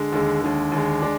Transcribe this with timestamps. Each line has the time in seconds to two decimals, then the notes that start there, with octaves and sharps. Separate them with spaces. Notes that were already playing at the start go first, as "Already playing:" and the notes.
Already playing: D3 G#3
0.12 D#2 D3 G#3
0.42 D#2 D3 G#3
0.72 D#2 D3 G#3
1.02 G#3 D4